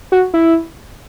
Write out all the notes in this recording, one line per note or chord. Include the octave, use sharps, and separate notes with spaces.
F#4
E4